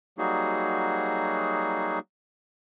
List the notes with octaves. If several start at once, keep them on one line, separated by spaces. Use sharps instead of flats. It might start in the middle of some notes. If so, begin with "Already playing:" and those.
F#3 G3 A#3 D#4 F#4 G#4